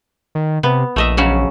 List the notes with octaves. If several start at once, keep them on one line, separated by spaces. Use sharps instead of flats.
D#3
C3 B3
A#1 A3 D#5 E5
C#3 F#3 C#4